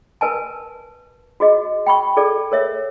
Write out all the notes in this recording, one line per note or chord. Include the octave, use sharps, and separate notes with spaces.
A#4 B4 G#5 A5
F#4 G#4 D#5
G5 B5 C#6
G#4 A4 D5
A#4 C#5 E5